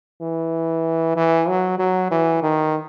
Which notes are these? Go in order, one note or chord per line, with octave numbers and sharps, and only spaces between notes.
E3
E3
F#3
F#3
E3
D#3